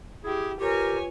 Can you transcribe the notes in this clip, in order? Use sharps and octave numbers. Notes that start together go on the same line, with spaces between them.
E4 G4 G#4
F4 G4 A#4 B4 C#5 G#5